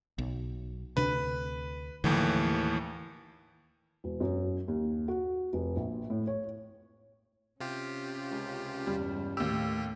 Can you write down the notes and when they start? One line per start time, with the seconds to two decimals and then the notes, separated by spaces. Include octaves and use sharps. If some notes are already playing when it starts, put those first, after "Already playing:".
0.18 B1
0.97 D2 C3 D4 B4
2.04 D#2 A2 D3 E3 F3
4.04 E1
4.20 F#2
4.68 D#2
5.08 F#4
5.53 F1
5.76 A#1
6.10 A2
6.27 C#5
7.60 C3 C#4 F4 G4
8.31 C#2
8.87 E2 G2 G3
9.37 D#2 A2 A3 G4 E6